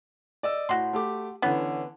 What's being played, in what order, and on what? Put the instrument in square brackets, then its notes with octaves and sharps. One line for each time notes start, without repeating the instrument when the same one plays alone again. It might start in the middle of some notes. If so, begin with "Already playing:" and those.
[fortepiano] D5 D#5 E6
[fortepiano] A2 [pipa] F#4 C6
[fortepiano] A3 G4 D6
[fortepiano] D3 E3 C#4 [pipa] B3